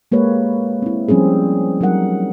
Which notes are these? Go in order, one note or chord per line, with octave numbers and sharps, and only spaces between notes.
G#3 A#3 G4 B4 C#5
C4 E4
F3 G3 C4 C#4 G#4
F#3 G3 D#4 A#4 F#5